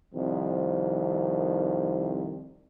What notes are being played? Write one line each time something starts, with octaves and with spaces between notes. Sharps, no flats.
C2 F2 D#3